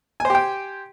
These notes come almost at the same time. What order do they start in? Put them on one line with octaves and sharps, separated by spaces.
G#5 C5 G4 G5